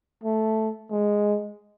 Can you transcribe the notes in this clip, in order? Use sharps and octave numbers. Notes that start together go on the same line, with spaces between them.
A3
G#3